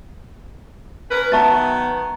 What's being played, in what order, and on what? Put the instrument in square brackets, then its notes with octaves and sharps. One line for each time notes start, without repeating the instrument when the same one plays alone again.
[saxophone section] C#4 A#4 B4
[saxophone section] D#3 F#3 B3 [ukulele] E5 A5 [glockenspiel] A#5 C#6 A6